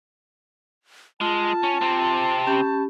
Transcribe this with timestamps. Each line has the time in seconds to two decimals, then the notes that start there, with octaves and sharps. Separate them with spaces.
1.21 G#3 F4 A5
1.63 C#4
1.82 C3 C4
2.47 C#4 G4 B5